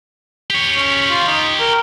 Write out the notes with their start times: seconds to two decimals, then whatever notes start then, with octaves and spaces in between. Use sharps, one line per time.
0.50 G4 C#5
0.75 C#4
1.10 F4
1.28 D#4
1.60 A#4